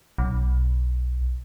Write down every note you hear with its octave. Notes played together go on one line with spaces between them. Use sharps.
B1